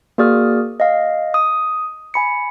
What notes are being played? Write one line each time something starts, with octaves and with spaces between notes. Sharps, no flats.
A#3 F#4 G#4 D5 D#6 F6
D#5 F5
D#6
G#5 B5 C#7